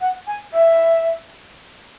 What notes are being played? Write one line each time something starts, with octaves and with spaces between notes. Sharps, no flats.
F#5
G#5
E5